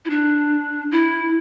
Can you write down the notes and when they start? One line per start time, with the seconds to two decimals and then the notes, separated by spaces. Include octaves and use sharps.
0.05 E4
0.10 D4
0.91 E4